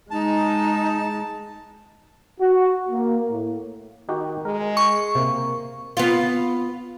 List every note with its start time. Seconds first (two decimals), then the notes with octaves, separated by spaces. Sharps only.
0.11 G#3 D#4 A5
2.40 F#4
2.89 A#3
3.28 A2
4.09 D#3 D#4 F#4 G4
4.45 G#3 A#4
4.77 C#6
5.15 C3 A#3
5.97 B3 F4